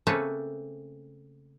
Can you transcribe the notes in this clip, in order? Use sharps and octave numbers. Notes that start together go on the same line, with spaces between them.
C#3 A3 A#3 C4 C#4 B4